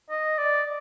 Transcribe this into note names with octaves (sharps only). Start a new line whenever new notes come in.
D#5
D5